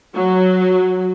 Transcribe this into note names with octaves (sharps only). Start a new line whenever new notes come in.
F#3